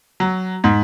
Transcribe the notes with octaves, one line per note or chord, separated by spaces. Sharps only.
F#3
G#2